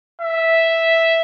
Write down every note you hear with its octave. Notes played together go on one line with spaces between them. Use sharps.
E5